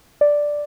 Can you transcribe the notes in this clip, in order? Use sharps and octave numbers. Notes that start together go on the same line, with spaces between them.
D5